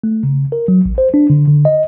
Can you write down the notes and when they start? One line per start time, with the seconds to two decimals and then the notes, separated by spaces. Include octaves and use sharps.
0.03 A3
0.23 C#3
0.52 A#4
0.68 F#3
0.85 A1
0.98 C5
1.14 D4
1.30 D3
1.47 D3
1.65 D#5